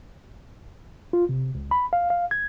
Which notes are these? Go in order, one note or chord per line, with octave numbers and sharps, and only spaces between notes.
F4
C3
C#2
B5
F5
F5
G#6